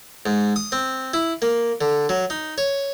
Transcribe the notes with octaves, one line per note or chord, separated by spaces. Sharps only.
G#2
D#6
C4
E4
A#3
D3
F#3
D#4
C#5